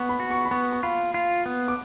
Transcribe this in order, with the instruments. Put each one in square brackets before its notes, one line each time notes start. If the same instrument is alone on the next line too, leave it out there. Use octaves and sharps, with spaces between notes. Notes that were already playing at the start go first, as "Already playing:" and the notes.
Already playing: [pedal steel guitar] B3 [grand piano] C#6
[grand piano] B5
[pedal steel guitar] F#4
[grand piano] C#6
B5
[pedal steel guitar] B3 [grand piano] C#6
[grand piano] C#6
[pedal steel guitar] F4 [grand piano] B5
[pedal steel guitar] F4
B3
[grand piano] D6